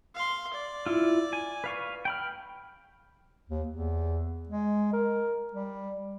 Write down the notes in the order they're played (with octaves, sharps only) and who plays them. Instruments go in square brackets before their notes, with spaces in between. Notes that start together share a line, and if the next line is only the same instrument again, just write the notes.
[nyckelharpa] F5 C6
D5
[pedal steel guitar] E4 F4
G#5
B4 F5 C#6
G5 B5 F6
[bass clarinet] D#2
E2
G#3
A#4
G3